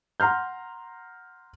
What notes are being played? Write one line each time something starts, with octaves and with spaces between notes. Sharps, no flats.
F#5 A#5 C6 F6 G6